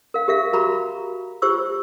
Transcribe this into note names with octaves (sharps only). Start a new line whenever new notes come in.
A#4 F5
G4 A#4 E5 F5
F#4 A#4 A#5 B5 C#6
F4 G4 C5 C#6 E6